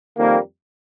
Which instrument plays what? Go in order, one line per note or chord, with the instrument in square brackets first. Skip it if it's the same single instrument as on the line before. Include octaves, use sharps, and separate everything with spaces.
[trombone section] F2 D#3 G3 A#3